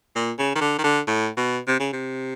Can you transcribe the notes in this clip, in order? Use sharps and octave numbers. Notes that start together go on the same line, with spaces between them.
A#2
C#3
D#3
D3
D#3
D3
A2
B2
C3
C#3
C3